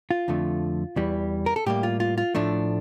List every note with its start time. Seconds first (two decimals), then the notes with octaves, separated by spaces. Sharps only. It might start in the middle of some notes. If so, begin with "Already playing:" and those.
0.11 F4
0.28 F2 D3 F3 A3
0.96 E2 E3 G3
1.46 A#4
1.56 A4
1.66 A2 G3 A#3 G4
1.83 F4
2.00 F4
2.18 F4
2.35 A2 F3 A3 D4